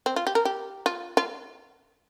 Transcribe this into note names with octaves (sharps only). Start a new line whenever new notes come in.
C4
F4
G4
A#4
G4
F4
F4